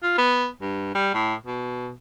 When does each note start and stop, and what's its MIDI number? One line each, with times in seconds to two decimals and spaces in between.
0.02 0.14 65
0.18 0.47 59
0.61 0.92 43
0.95 1.11 55
1.14 1.34 45
1.46 1.91 47